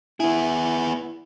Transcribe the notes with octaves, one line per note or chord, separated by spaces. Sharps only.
B3 E4 G#4